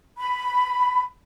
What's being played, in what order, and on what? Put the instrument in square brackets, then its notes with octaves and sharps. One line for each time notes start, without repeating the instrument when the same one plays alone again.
[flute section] B5